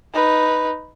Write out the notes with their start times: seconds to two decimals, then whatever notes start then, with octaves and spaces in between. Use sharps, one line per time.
0.14 D#4 B4